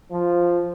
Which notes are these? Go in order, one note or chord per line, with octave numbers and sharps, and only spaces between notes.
F3